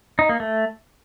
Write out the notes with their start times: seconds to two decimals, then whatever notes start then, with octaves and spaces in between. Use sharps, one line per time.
0.19 D#4
0.29 A#3
0.40 A3